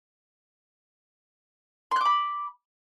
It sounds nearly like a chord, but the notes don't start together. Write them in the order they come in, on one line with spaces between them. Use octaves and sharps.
C6 F#6 D6 B5